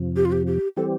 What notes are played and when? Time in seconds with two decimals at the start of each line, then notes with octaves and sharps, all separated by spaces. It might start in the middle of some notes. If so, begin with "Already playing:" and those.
Already playing: F2 C3 F3
0.16 G4
0.25 F4
0.32 G4
0.47 G4
0.77 E3 G3 C4 G4 A4